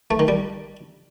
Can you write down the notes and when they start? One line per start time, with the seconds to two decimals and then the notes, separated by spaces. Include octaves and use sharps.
0.11 A3
0.19 D#3
0.28 G3